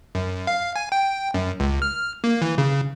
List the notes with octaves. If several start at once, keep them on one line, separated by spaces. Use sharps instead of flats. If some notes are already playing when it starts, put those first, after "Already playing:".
F#2
F5
G#5
G5
F#2
C#2
F6
A#3
E3
C#3